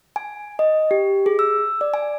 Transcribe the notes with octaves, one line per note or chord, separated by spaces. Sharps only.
G#5
D#5
G4
G#4
E6
D5
G#5